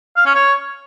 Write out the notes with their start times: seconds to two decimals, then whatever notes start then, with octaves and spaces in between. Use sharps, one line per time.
0.17 F5
0.26 C#4
0.35 C#5